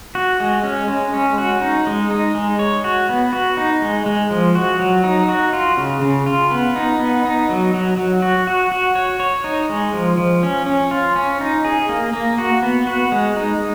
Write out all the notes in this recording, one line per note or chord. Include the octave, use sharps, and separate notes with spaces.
F#4
G#3
C#4
G#3
C#4
F#4
D#4
G#3
D#4
G#3
C#5
F#4
B3
F#4
D#4
G#3
G#3
F3
F#4
F#3
D#4
F#4
F4
C#3
C#3
F4
B3
D#4
B3
D#4
F#3
F#3
F#3
F#4
F#4
F#4
C#5
C#5
D#4
G#3
F3
F3
C#4
C#4
F4
C#4
D#4
G#4
A#3
A#3
F#4
B3
F#4
G#3
D#4